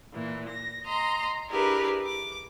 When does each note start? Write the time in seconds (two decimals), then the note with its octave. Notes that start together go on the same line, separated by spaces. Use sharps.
0.13 A#2 E3
0.49 A#6
0.85 D#5 A#5 C6
1.49 D4 E4 G4 G#4 A#4 B4
2.05 D6